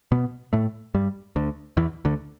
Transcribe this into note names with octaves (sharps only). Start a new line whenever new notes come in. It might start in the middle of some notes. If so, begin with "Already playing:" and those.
B2 B3
A2 A3
G2 G3
D2 D3
E2 E3
D2 D3